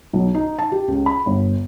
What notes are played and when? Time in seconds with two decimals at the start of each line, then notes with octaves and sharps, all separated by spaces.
0.13 B1
0.34 D#4
0.59 A5
0.72 G4
0.88 C#2
1.06 B5
1.26 G1